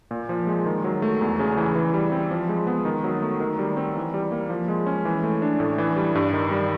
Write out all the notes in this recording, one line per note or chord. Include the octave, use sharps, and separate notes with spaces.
A#2
F3
G#3
D#3
F#3
A3
E2
C#3
E3
E3
G3
C4
F3
G#3
B3
D#3
F#3
A3
D#3
G3
C4
E3
G3
A#3
F3
G#3
C#4
E3
A3
D4
A2
E3
G3
G2
D#3
G3